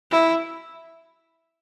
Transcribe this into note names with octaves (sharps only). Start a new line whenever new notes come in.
E4